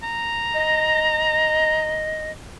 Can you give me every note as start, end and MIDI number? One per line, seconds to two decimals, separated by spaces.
0.03 1.99 82
0.54 2.31 75